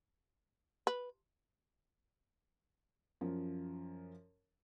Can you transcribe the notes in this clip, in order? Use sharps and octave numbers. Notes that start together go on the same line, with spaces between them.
B4
F#2 F3